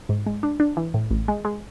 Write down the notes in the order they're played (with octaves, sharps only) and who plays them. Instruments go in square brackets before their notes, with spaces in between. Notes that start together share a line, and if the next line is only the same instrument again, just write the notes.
[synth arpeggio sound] G#2
G#3
D4
D4
E3
A2
A1
G#3
G#3